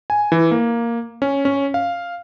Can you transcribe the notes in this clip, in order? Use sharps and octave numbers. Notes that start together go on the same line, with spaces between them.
G#5
E3
A#3
C#4
C#4
F5